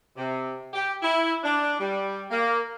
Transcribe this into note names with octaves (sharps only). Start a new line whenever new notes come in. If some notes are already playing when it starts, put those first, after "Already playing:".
C3
G4
E4
D4
G3
A#3